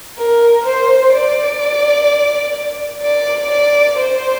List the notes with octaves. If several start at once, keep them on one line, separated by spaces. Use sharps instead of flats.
A#4
C5
D5
D5
D5
C5